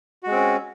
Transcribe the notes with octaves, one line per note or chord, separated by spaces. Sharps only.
G#3 C4 C#4 F#4